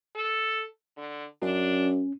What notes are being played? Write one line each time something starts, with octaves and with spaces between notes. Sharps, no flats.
A4
D3
F#2 C#4 D4